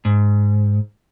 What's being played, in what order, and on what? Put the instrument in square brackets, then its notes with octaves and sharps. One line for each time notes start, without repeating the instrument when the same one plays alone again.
[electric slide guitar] G#2